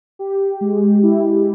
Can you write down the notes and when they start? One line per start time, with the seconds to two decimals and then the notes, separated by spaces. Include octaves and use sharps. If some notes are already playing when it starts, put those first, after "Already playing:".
0.19 G4
0.61 G#3
1.03 E4